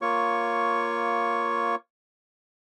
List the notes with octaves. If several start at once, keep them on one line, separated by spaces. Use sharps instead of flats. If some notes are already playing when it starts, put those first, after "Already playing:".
A#3 F4 C#5 C#6